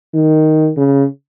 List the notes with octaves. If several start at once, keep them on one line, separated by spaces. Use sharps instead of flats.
D#3
C#3